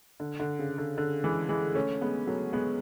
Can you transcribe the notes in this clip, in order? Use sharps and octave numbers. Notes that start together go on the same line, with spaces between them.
D3
D3
C#3
D3
D3
E3 G#3
E3 G#3
A3 C#4
G#3 B3
F#3 A3
G#3 B3